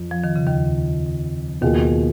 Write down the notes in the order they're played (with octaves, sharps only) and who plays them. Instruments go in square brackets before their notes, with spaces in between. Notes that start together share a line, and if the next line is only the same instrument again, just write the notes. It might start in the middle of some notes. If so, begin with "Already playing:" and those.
Already playing: [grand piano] F2
[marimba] F3
D#3
C#3
D#2 D#3
[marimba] D#2 D#3 [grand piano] B2 A#3 F4 G#4